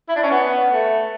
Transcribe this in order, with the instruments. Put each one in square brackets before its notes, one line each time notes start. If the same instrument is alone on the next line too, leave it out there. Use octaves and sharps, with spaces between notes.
[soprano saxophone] E4
D4
C#4
B3
A3